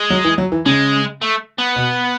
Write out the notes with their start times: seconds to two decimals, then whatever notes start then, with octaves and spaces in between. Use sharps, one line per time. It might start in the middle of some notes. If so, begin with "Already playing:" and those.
Already playing: G#3
0.10 F#3
0.24 E3
0.38 F#3
0.52 E3
0.66 C#3 G#3
1.21 A3
1.58 B3
1.76 B2